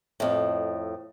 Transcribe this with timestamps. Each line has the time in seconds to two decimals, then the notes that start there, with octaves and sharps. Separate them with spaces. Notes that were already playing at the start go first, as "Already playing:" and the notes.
0.20 F2 A2